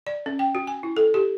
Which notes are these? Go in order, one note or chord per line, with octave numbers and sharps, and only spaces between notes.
D5
C#4
G5
F#4
G#5
E4
A4
G4